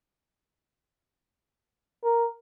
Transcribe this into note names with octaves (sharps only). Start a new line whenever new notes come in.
A#4